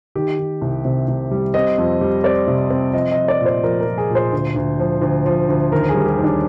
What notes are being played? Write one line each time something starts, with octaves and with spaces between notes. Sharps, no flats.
D#3 G4
D#3
C2
C3
C3
G3
C4 D#5
F2
G3
C4 D5
C3
C4
F3 D#5
D#5
F3
D5
A#2
C5
F3 A#4
A#4
F3
G#4
A#2
C5
D2
D2
F3
D2
F3
D2
D#2 A#4
G#4
G3
G4
D#2
D4